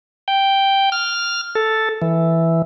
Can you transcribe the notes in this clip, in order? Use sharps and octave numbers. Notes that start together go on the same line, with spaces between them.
G5
F6
A4
E3